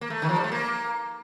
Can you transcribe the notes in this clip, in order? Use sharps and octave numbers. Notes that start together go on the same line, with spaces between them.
A#3
A3
D#3
F3
G3
A3
A#3